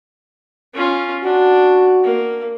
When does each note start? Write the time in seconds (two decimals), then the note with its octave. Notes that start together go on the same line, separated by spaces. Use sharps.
0.74 C#4 F4
1.23 D4 F#4
2.03 A#3